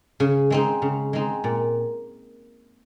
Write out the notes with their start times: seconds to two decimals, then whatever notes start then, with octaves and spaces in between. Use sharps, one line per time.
0.20 C#3
0.50 G#3 C4 D#4
0.82 C#3
1.13 G#3 C4 D#4
1.44 A#2